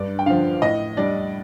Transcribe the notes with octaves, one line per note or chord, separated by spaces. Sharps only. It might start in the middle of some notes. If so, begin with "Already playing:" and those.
Already playing: G2 D5
G5
D3 F3 F5
A2 D#5
G3 D4 D5